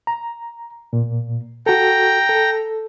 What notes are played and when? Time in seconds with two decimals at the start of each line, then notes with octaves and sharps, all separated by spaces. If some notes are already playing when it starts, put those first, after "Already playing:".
0.07 A#5
0.93 A#2
1.66 F#4 A4 G5 A#5
2.29 A4